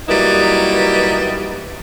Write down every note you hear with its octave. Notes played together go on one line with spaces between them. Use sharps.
F#3 G3 A#3 D#4 E4 B4